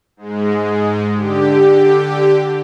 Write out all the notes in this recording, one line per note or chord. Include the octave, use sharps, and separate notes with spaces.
G#2 G#3
D3 G4